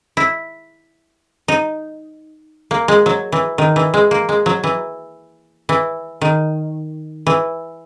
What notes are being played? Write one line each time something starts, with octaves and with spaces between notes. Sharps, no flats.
E4
D#4
A#3
G#3
F#3
E3
D#3
E3
G#3
A#3
G#3
F#3
E3
E3
D#3
E3